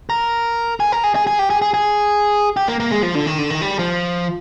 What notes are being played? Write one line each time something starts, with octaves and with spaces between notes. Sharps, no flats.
A#4
G#4
A#4
G#4
G#4
G#4
G4
G#4
G#4
G#4
G4
A#3
A#3
G#3
F3
D3
D#3
D3
D#3
G3
F3